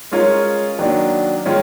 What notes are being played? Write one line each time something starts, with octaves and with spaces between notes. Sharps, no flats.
G#3 C#4 F4 A#4 C#5
D#3 F#3 A#3 D4
D#3 G#3 C#4 F4